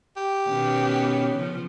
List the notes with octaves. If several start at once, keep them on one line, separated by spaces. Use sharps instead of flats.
G4
B2 D#3 B3 C#4
C#3 F3